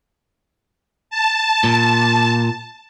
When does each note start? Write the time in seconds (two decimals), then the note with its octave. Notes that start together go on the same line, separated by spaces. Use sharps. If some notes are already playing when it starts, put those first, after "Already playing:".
1.10 A5
1.64 A#2